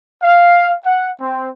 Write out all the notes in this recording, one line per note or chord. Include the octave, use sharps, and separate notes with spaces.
F5
F#5
C4